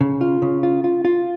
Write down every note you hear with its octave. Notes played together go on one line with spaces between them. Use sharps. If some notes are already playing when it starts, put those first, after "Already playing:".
C#3
F4
C#3
F4
F4
F4